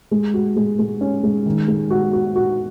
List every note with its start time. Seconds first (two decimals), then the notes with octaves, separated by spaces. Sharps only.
0.11 G#3
0.34 F#4
0.56 G#3
0.79 G#3
1.01 C#4
1.23 G#3
1.46 D#3
1.68 G#3
1.90 F#4
2.13 F#4
2.36 F#4